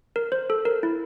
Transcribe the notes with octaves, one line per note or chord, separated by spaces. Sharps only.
A#4
C5
A4
A#4
E4